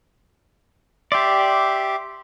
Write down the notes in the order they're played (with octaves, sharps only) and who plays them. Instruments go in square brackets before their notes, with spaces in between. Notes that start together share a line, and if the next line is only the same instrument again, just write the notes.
[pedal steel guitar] G4 D5 [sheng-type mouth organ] E5 C6 D6